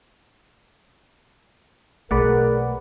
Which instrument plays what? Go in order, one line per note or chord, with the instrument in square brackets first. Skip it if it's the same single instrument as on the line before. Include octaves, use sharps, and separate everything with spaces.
[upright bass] B1 [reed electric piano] A3 G#4 [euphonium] A#4 [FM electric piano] B4 D5 F#5